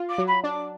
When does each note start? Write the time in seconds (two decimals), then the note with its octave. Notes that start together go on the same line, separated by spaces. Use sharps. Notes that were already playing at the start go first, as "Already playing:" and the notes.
Already playing: F4
0.09 D6
0.18 F#3
0.27 B5
0.44 D4 D6